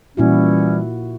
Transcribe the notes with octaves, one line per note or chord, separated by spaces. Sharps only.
A#2 E3 G3 C#4 E4 F#4